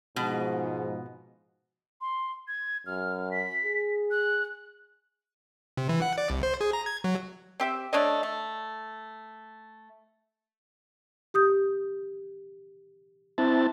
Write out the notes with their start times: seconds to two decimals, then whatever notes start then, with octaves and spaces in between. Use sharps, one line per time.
0.16 G#2 B2 F3
2.01 C6
2.48 G#6
2.86 F#2 F6
3.31 B6
3.64 G#4
4.11 F#6
5.77 C3
5.89 E3
6.02 F#5
6.18 D5
6.30 C2
6.43 C5
6.61 G#4
6.73 A#5
6.86 G#6
7.04 F#3
7.60 C4 G4 E5
7.93 A3 D4 C#5 D#5
8.23 A3
11.34 G4 D#6 G6
13.38 C4 E4 A5